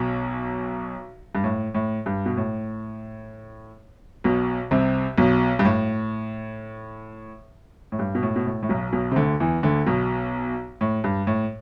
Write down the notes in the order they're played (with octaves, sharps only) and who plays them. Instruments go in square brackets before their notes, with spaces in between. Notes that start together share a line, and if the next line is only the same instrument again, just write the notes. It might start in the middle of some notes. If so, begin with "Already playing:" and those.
Already playing: [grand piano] B1 B2
G2
A2
A2
G2
B2
A2
B1 B2
C2 C3
B1 B2
G2
A2
A2
G2
B2
A2
B2
A2
A2
B1 B2
B1 B2
C3
D2 D3
E2 E3
D2 D3
B1 B2
A2
G2
A2